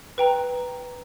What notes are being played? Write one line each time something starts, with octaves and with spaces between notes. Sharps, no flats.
B4 G5 A#5